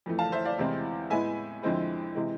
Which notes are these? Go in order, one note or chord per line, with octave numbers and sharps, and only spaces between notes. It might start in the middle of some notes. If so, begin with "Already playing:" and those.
F2 E3 A3
F5 A5
C5 E5
D5 F5
E2 C3 G#3 C4 E4
A2 G#3 B3 E4 E5 G#5
F2 D3 G#3 C4 E4
C3 E3 G#3